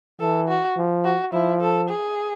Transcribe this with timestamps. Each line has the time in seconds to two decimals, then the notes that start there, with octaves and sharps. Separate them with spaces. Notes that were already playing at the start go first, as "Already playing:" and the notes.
0.20 E3 A4
0.48 F#4
0.77 F3
1.04 F#4
1.33 F3 E4
1.61 A4
1.89 G#4